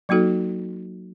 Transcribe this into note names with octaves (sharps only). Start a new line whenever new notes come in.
F#3 A#3 D#4 F#4 A4